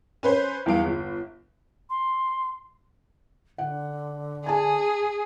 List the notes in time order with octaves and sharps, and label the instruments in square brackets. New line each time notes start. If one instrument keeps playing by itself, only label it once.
[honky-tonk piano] C#4 B4 C5
E2 G2 F5 D7
G1
[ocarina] C6
[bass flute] D3 [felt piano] F#5
[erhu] G#4 [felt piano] G#5 A5